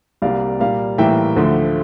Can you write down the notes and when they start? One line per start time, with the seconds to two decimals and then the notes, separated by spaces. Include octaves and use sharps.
0.22 C2 C3 G3 A#3 D5 F5
0.60 A#2 G3 A#3 D5 F5
0.98 A2 E3 G3 A#3 E5 G5
1.36 D2 D3 F3 A3